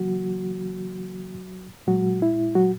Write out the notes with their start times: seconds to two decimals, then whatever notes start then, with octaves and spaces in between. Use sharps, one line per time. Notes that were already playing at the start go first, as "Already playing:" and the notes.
Already playing: C#3 E3 F#3 A#3 F#4
1.87 A#2 F#3 G#3 F#4
2.22 E4
2.55 F#3 F#4